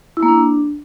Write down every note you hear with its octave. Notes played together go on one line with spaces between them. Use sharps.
E4
A#3
D4